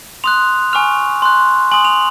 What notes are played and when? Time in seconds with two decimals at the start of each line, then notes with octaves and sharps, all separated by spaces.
0.24 C6 D#6 F#6 F7
0.73 G#5 C#6 F6 F7
1.22 C6 F#6
1.72 G#5 C6 D#6 F#7
1.85 F7